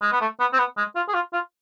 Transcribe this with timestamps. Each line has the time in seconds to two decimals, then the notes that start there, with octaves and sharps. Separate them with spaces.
0.02 G#3
0.13 B3
0.21 A3
0.40 B3
0.53 C4
0.58 B3
0.78 G#3
0.96 F4
1.09 G#4
1.14 F4
1.33 F4